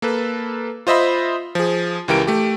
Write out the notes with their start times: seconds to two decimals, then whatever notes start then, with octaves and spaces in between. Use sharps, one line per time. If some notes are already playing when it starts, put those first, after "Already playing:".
0.02 A#3 A4 B4
0.87 F4 C5 D#5 E5 B5
1.55 F3 G#4
2.08 C#2 E3 G4 A#4 D7
2.27 A3 G4